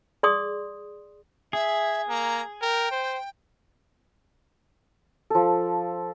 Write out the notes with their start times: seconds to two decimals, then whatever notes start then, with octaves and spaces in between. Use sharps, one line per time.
0.23 G#4 D5 C6 D#6
1.53 G#4 E5
2.09 A#3 A#5
2.62 A#4 G5
2.91 C5
5.30 F3 A4